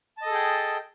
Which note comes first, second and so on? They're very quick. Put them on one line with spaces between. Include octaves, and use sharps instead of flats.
A5 D#5 A4 G#4 G5